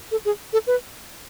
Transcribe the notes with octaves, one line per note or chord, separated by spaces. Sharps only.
A4
G#4
A4
B4